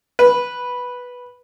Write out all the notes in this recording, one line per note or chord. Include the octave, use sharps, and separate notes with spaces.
B4